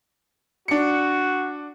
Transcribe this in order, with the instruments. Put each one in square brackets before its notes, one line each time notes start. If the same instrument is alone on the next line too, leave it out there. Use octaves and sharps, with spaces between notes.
[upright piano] D4 C#7 [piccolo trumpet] F#4